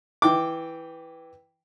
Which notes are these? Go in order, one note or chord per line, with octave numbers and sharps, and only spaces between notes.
E3 G5 D6